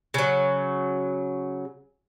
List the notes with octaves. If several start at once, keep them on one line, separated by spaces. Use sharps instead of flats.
C#3 F#3